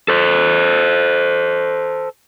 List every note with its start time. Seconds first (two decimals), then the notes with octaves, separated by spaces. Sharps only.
0.08 A4 C5